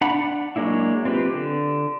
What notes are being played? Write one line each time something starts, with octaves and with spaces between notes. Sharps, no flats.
D4 F#5 B5
F#3 G#3 A#3 D4 E4
C4 F4 G4 B4
D3